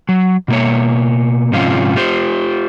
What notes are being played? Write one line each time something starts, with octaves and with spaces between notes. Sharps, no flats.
F#3
B2 A#3 C#5
G#2 C3 F3 C#4 F4
F4 G4 C5